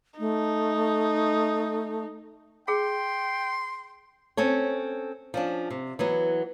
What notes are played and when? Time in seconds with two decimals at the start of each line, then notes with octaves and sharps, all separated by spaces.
0.19 A3 D#4
2.68 G#4 G5 C6
4.37 C4 C#4 A4 C#5
5.34 F3 C#4 D4
5.70 C3
5.99 E3 F#3 B3